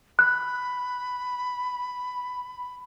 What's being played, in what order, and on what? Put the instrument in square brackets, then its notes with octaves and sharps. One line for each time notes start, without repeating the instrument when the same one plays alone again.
[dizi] B5 [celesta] F#6